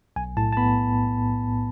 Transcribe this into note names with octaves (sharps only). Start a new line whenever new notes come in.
B1 G#5
A2 A5
A5
B3 B5